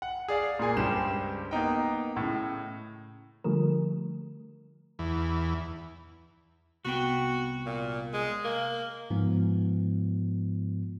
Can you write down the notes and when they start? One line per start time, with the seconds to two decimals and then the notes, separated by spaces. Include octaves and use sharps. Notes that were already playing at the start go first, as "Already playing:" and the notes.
0.02 F#5
0.28 G#4 D5 F5
0.59 A#2 A#3 G#4 G#5
0.77 C#2 G2 G4 C5 E7
1.51 A#3 B3 D#4 G5
2.16 A2 C#3
3.44 D3 F3 G3 A3 A#4
4.99 E2
6.85 C2 B3 F#4 G5
7.66 A#2
8.13 G#3
8.45 A#3 A#4
9.10 G#2 F3 B3